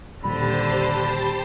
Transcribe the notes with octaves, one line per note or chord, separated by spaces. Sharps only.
D#1 D3 G3 G4 C5 A5 B5